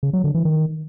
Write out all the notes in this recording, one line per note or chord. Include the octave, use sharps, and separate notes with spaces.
C#3
F#3
D3
E3
D#3